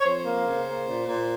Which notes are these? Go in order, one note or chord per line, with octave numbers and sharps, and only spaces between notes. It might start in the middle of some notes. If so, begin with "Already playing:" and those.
C#5
F2 C5
A#3
C#3
A#3
A#2
A#2